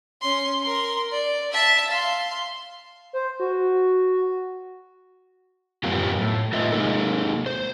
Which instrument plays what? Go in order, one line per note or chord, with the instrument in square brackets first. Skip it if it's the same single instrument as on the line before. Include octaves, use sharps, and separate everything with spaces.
[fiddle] C#4 C6
A#4 C6
D5
E5 A5
F5 C6
[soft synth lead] C5
F#4
[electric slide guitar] F#2 A2 B3 F4 G4
A2
A3 F4 B4 D#5 E5
G#3 A#3 D#4 A4
C5